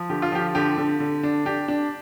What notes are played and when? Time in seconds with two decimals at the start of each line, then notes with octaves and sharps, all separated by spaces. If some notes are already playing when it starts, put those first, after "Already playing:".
Already playing: F3
0.10 D3 G4
0.22 F4
0.32 F3 G4
0.55 D3 G4
0.78 D3
1.00 D3
1.23 D4
1.45 D4 G4
1.68 D4